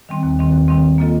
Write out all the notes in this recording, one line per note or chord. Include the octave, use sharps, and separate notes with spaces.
D#3 G3 C4
D#2
D#3 G3 C4
D#2
D#3 G3 C4
D#3
A#3 F4 A4 D#5